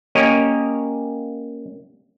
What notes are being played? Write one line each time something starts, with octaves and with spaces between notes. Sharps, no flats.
A#3 C#4 G4 A#4 C#5 D#5